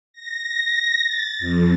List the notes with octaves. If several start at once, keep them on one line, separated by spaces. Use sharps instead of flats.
A#6
A6
F2